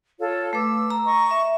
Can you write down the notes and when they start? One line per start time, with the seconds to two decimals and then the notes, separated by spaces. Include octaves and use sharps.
0.19 F4 A4 C#5
0.53 A3 B4 D6 E6
0.90 A#5
1.05 D#5 C#6
1.31 E5